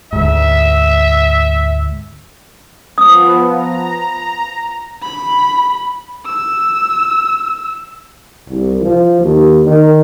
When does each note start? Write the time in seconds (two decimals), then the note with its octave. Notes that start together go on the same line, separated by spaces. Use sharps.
0.13 D2 G#2 E5
2.98 F3 B3 D#6
3.52 A#5
5.02 B5
6.26 E6
8.49 C2
8.82 F3
9.21 D#2
9.65 D#3